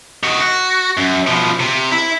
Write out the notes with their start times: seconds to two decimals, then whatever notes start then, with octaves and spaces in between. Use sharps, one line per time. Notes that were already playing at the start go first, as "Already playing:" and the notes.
0.23 D#3 F#4
0.42 F#4
0.97 F#2
1.27 B2 F3
1.60 C3
1.92 E4